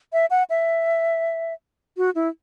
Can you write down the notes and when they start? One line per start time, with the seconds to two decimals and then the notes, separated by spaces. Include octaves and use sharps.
0.13 E5
0.30 F#5
0.50 E5
1.97 F#4
2.15 E4